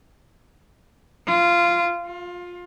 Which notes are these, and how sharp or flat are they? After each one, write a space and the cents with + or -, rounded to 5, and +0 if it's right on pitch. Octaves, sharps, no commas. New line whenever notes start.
F4 -15
F4 +20